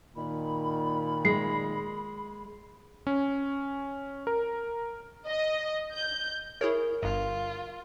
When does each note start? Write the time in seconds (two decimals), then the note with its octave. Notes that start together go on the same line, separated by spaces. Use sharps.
0.16 A#2 D#3 B5
1.25 G#3 C7
3.07 C#4
4.27 A#4
5.27 D#5
5.93 G6
6.61 E4 G#4 A#4 C#5
7.03 G1 G2 F4